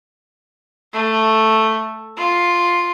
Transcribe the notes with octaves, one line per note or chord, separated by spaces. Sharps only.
A3
F4